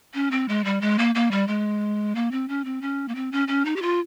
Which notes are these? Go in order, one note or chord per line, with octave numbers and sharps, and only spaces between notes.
C#4
C4
G#3
G3
G#3
A#3
A#3
G3
G#3
A#3
C4
C#4
C4
C#4
A#3
C4
C#4
C#4
D#4
G4
F4